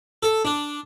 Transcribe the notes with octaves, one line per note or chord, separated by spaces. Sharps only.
A4
D4